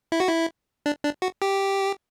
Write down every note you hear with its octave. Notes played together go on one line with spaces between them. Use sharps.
E4
F#4
E4
D4
D4
F#4
G4